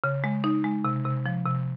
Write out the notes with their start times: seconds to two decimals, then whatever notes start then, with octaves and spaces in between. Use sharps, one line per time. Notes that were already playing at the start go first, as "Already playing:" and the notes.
0.04 C#3
0.24 G#3
0.44 D#4
0.64 G#3
0.85 C3
1.05 C3
1.26 F3
1.46 C3